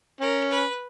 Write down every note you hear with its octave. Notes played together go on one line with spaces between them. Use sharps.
C#4 A#4
B4